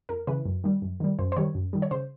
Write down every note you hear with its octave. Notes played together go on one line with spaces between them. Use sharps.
F2 A#4
C#3 E3 B4
F#2
D#3 G3
F#2
D#3 G3
F#2 C5
C5
D#3 G3 C#5
F#2
D#3 G3
C#5
C#3 C5